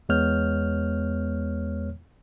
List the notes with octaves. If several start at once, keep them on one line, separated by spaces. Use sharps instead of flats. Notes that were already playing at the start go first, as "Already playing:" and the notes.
E2 G#3 B3 C#5 F6 G6